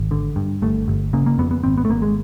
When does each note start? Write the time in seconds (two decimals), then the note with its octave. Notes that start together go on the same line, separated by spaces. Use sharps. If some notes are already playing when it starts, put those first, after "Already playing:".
Already playing: G#1
0.11 D3
0.36 G2
0.62 G1 A3
0.88 G1
1.13 C#3 A#3
1.26 A#3
1.38 F2 B3
1.51 B3
1.63 G#1 C4
1.77 B3
1.85 A3
1.90 G#1 A#3
2.02 G#3